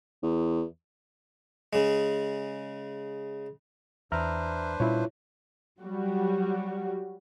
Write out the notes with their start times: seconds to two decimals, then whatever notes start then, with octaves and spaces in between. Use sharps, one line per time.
0.23 E2
1.73 C#3 G#3
4.12 E2 D4 B4 C5 E5 A#5 F6
4.80 A#2 G3 C#4 E4 F4 C#5
5.81 F#3 G3 F#4